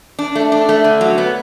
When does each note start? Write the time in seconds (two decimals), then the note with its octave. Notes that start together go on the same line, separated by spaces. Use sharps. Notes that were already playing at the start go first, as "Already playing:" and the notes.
0.19 D4
0.35 A3
0.52 D4
0.69 A3
0.84 D3
1.01 F#3
1.18 B3